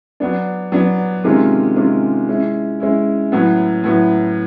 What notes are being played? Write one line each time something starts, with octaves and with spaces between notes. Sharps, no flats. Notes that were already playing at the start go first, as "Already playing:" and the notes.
F#3 B3 D4
F#3 B3 D4
C3 D#3 G#3 C#4 F4
C3 D#3 G#3 C#4 F4
G#3 C#4 E4
G#3 C#4 E4
A2 F#3 B3
A2 F#3 B3